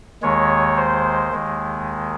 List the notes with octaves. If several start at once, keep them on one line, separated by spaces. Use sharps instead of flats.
D#2 D#3 G#3 C#5
C5
D#2 D#3 G#3